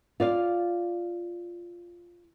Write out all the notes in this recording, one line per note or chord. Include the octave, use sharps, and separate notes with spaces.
F4 D5 F5